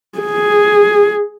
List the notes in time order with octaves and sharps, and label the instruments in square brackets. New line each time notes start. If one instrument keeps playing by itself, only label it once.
[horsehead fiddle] G#4